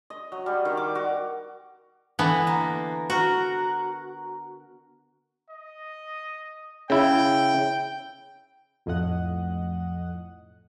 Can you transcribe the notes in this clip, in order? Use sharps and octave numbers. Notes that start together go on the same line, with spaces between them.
D#5
F#3
G3
D#3
D6
F#4
D3 E3 B3
A#3
F#4 A#4
D#5
C#3 E4 G5
B1 F2 A2 D#5 F#5